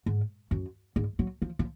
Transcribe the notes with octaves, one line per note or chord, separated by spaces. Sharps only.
G#2
F#2
G#2
F#3
F3
F3